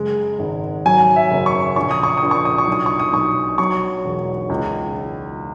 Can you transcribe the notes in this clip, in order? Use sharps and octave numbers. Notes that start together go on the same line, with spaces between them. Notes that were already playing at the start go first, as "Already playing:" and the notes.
Already playing: F#1 G#3
G#1
F#3 G#5
E5
F#1
C#6
A#1 C#6
D#6
C#6
D#6
A#1
C#6
D#6
C#6
B1 D#6
C#6
D#6
B1 C#6
F#3 C#6
E1
C#2